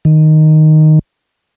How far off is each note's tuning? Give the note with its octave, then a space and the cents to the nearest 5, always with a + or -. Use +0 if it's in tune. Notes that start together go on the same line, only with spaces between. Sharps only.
D#3 -5